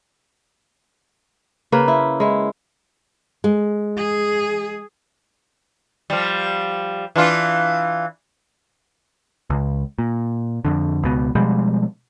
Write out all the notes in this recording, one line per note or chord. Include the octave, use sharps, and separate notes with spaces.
C#3 A#3 B4
E4
G#3 E4
G#3
G#4
F3 G3
E3 D4 F4
C#2
A#2
F2 D3
C#2 B2
B2 F3 G3 G#3